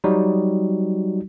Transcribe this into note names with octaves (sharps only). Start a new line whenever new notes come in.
F#3 G3 D#4 F#4